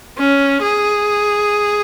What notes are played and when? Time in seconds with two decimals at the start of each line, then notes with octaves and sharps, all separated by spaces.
0.18 C#4
0.62 G#4